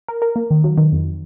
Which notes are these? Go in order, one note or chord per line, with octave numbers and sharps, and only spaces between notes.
A#4
A#4
A#3
D#3
F#3
D#3
F2